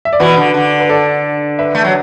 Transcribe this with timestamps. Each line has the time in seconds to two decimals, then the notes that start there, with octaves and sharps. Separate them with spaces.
0.05 E5
0.13 D5
0.20 B2 E3 F#4 B4
0.37 D3
0.54 D3
0.80 B4
0.89 A4 D5
1.59 B4 E5
1.75 A3
1.84 F#3